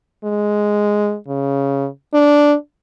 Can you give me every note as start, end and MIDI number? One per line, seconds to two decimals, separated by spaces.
0.24 1.16 56
1.28 1.87 49
2.14 2.55 62